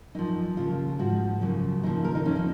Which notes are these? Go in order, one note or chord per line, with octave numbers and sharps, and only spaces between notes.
F#2 F3 D#4
D#2 C#3 F3 F4
G#2 F3 F#4
F#2 C#3 F3
D#2 C#3 F3 D#4
A#4
D#4
F2 F3 C#4
D#4